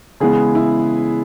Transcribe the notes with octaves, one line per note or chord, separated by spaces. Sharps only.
C#3 E3 G#3 B3 G#4
E4